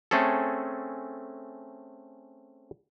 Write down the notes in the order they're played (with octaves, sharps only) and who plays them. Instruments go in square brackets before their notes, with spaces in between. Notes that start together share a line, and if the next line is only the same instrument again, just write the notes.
[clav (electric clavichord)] A3 C4 C#4 G#4 A4